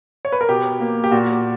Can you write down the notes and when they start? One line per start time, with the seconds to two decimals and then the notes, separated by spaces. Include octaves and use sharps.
0.25 C#5
0.32 B4
0.41 A#4
0.49 B2 G4
0.80 A#3
1.04 G4
1.11 A#2 F#4